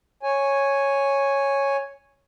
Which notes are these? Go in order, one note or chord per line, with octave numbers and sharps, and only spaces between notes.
C#5 G#5